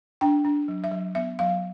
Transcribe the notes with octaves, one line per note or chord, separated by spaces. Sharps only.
D4 G5
D4
F#3
E5
F#3
B3 E5
F#3 F5